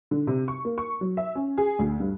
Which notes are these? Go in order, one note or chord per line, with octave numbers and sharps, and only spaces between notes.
D3
C3
C#6
A#3
C#6
F#3
E5
C#4
G#4
D2
G2